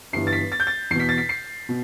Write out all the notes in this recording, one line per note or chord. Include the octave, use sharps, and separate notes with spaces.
G1 G2 E3 C7
A6
B6
A6
G6
A6
E2 B2 B6 C7
A6
B6
C7
B2